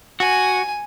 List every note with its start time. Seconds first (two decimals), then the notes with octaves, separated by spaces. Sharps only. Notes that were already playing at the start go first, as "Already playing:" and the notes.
0.20 F#4 G#5